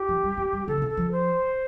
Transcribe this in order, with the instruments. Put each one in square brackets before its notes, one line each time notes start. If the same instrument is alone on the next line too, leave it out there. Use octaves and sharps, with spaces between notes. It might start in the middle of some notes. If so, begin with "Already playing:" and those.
Already playing: [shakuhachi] G4
[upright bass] F3
G3
A3
G3
[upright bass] D3 [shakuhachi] A4
[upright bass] D3
C3
[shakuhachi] A4
[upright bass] F3
[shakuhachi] C5